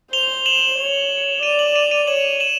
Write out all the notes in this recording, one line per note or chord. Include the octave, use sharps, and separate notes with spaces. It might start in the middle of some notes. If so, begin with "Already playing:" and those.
C5 F7 G7
E7 F#7
C#5
D5 D#7 F7
E7 F#7
D#7 F7
D#7 F7
C#5 E7 F#7
E7 F#7